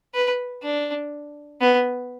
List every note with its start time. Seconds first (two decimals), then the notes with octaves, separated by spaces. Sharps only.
0.15 B4
0.63 D4
1.61 B3